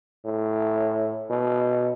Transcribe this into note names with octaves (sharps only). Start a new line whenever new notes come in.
A2
B2